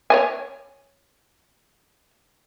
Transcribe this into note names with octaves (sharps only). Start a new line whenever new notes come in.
C#5 D#5 G#5